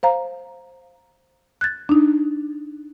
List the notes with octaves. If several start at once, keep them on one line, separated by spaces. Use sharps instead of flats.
C5 F5 A#5
F#6 G#6 A6
D4 D#4